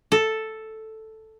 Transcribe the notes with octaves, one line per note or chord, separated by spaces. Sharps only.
A4